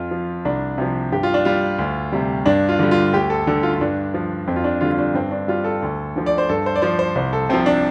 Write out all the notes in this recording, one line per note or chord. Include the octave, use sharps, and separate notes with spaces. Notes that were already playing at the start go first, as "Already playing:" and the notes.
Already playing: F2 F4
F3
C2 D4
C3 F3
G2 G4
F4
D4
G3 F4
D2
C3 G3
G2 D4
F4
D3 G3
F4
D2 G4
A4
D3 G3 A4
F4
F4
G2 D4
F3
F2 C4
F4
D4
D3 G3 F4
F4
D4
G2 C4
D4
G3 F4
A4
D2
D3 F3
D5
C5
G2 A4
C5
D5
F3 C5
C5
C2 C5
A4
C3 F3 C4
D4